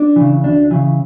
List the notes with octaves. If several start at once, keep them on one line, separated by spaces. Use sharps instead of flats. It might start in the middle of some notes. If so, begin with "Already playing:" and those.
Already playing: D4
C#3 E3
D2 D4
C#3 E3